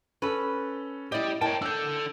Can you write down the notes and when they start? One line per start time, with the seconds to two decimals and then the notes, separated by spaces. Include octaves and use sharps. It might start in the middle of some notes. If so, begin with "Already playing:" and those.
0.22 C#4 A4 B4
1.12 E4 G4 D5 D#5
1.41 A#3 C#5 G5 A5
1.62 D4 A4 E6 G6